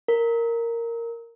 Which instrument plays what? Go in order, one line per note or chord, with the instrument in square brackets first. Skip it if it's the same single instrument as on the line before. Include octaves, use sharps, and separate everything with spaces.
[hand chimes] A#4